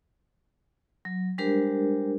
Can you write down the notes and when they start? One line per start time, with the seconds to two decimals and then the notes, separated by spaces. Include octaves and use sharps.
1.05 F#3
1.38 G3 G#3 D4 G4 A#4 C5